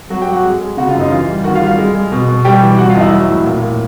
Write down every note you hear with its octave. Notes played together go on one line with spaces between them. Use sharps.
F#3 F#4 F#5
G4 G5
F#3
F#4 F#5
G#3
G#3
C#3 F#4 F#5
F4 F5
F#2 D#4 D#5
E3 F4 F5
G3
D#3 F#4 F#5
F4 F5
G3
F4 F5
G#3
G#3
B2
B2
G3 G4 G5
E3
G3 F#4 F#5
F4 F5
E2 D#5
E4 E5
F#3
A2
A#2
A#2